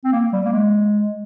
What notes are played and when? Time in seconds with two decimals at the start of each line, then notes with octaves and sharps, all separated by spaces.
0.04 C4
0.12 A#3
0.33 G3
0.46 A#3
0.52 G#3